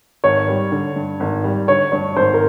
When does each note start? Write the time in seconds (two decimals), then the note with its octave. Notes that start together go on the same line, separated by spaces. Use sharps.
0.24 G#1 C#5
0.48 G3
0.72 D3
0.96 G2
1.20 G#1
1.44 G3
1.68 D3 C#5
1.92 G2 C#5
2.16 G#1 C5
2.34 A#4